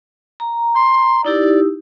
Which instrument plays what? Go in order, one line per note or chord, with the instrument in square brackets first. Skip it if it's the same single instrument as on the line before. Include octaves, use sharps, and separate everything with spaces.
[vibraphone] A#5
[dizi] C6
[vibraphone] D#4 E4 G4 [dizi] D5